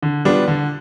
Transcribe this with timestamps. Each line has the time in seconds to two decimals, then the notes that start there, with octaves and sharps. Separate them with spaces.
0.02 D3
0.25 G3 B3 D4 F4
0.48 D3